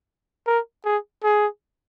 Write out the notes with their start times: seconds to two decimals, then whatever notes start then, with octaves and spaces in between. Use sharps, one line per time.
0.47 A#4
0.85 G#4
1.24 G#4